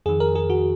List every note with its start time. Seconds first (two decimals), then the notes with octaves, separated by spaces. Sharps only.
0.06 F2 D#3 G#4
0.20 A#4
0.35 G#4
0.50 F#4